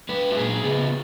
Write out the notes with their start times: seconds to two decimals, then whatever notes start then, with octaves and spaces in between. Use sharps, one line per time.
0.09 G#3 B4
0.31 F#4
0.36 A#2 G#4
0.63 C#3 B3